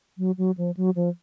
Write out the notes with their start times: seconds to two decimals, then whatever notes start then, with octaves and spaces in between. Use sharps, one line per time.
0.18 F#3
0.38 F#3
0.58 F3
0.77 F#3
0.96 F3